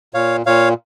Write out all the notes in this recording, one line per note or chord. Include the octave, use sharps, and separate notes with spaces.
A#2 C#5 F5
A#2 C#5 F5